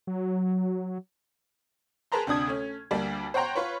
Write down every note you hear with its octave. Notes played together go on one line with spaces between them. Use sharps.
F#3
G#4 A#4 B4 A5 A#5 C6
D2 C3 D4 D#6 G#6
A3 C#4
D2 G3 A#3 D4
C5 C#5 F#5 G5 A#5 C6
F4 B4 C#5